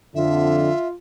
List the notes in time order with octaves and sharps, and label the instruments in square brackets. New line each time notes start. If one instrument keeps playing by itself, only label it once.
[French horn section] F2 D3 [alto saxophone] F4 [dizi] E5